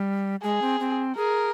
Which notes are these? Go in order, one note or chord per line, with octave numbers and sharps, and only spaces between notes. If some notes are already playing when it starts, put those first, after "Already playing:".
Already playing: G3
G#3 G#4
C4
C4
G#4 A#4